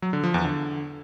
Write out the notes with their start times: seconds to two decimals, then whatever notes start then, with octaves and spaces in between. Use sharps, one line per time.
0.02 F#3
0.13 D3
0.24 F3
0.34 E2
0.45 D3